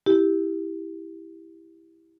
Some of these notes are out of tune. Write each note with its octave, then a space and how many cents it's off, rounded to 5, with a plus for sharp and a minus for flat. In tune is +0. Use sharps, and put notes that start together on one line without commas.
E4 -10 G4 +5